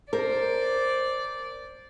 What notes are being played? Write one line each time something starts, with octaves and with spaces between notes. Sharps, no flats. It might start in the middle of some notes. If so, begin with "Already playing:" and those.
A#4 C5 D5